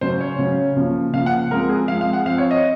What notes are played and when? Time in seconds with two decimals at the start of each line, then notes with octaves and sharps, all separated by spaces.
0.01 C#3 F#3 C#4 C5
0.20 C#5
0.39 C#3 F#3 C#4
0.76 C#3 F3 A#3
1.13 C#3 F3 A#3 F5
1.26 F#5
1.51 F3 G#3 C4 A#4
1.69 G#4
1.88 F3 G#3 C4 F5
2.01 F5
2.13 F#5
2.26 F3 C4 F5
2.38 C#5
2.51 D#5